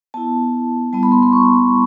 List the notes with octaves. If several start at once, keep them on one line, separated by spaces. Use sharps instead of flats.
B3 E4 A5
G3 B3 E4 A5
B5
C6
C6
C#6